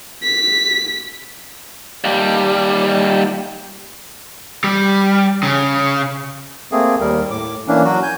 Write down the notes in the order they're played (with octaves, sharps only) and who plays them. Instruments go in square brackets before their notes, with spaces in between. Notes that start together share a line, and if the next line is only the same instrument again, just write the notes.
[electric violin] B6
[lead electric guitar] D#2 G3
G3
C#3
[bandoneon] A3 A#3 C4 G#4
D#2 G3 A#4
A2 D6
E3 A#3 C#4 D4
F#3 F#4
G#5 G6